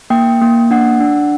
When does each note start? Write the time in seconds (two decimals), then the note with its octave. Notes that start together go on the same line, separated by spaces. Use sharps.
0.10 A#3 G5
0.41 A#3
0.71 D4 F#5
1.01 D4